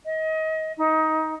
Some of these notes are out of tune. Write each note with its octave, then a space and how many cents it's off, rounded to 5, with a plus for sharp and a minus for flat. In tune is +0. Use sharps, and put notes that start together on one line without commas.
D#5 +30
D#4 +20